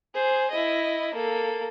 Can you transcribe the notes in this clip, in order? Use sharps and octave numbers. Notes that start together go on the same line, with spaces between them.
G#4 C5
E4 D#5
A#3 A4